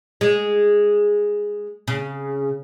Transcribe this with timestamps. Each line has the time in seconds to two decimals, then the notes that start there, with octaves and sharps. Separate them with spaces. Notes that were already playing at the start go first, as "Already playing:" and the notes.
0.21 G#3
1.88 C#3